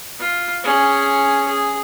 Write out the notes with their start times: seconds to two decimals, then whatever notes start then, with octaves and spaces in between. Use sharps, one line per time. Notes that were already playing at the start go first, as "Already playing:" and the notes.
0.19 F4
0.64 C#4 G#4
1.48 G#4